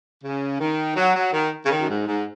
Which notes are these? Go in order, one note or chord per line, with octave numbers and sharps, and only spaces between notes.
C#3
D#3
F#3
F#3
D#3
C#3
D#3
F#2
G#2
G#2